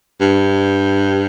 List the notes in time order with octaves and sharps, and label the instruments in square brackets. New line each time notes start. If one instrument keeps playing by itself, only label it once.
[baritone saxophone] G2